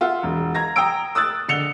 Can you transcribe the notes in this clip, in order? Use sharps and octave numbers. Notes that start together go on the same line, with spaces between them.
F4 E5 F#5
E1
A#5 G#6 A#6
G5 A#5 D#6 E6 D7
D#6 E6 F#6 A6
D3 C#7 F7 G7